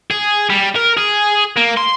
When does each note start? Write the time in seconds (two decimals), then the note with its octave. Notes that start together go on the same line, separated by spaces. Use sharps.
0.11 G#4
0.50 G3
0.75 A#4
0.97 G#4
1.57 A#3
1.77 C6